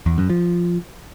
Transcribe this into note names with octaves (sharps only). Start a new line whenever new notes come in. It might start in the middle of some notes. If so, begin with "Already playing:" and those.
E2
F#2
F3